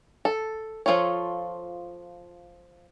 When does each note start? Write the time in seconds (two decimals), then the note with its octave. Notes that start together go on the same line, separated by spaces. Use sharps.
0.25 A4
0.86 F3 D4 F4 A4 C#5